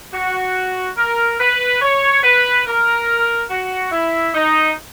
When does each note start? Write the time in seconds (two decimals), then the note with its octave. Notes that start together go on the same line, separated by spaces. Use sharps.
0.13 F#4
0.98 A#4
1.40 B4
1.82 C#5
2.24 B4
2.67 A#4
3.50 F#4
3.92 E4
4.34 D#4